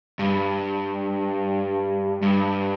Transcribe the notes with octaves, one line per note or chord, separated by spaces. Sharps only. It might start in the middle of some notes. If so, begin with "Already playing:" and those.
G2
G2